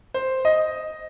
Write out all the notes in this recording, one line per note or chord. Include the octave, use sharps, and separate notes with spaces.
C5
D#5